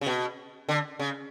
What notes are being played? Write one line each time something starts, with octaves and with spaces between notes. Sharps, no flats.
C#3
B2
D3
C#3